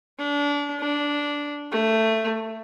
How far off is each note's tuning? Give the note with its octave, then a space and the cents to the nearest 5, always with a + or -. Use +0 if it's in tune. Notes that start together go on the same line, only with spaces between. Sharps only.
D4 -30
D4 -10
A3 +15